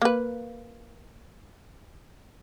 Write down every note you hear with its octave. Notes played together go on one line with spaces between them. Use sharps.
A#3 B4